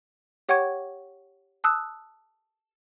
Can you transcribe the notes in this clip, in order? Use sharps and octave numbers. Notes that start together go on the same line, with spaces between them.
G4 C#5 F#5 G5 C#6 G#6
A5 D#6 E6 F#6